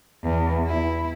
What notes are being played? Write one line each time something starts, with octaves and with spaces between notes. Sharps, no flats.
E2
E4